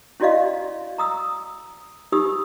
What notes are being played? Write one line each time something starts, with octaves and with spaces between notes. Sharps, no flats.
C#4 E4 F#4 D5 D#5 F5
A#5 D#6 E6
D#4 F4 G4 D#6 E6